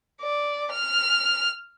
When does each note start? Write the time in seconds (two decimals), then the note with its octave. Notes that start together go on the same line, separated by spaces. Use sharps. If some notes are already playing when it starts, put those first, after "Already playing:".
0.22 D5
0.71 F6